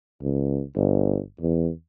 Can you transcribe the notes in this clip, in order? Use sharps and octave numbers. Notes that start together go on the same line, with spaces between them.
C#2
G1
E2